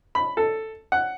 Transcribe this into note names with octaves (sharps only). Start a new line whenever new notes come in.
B5
A4
F#5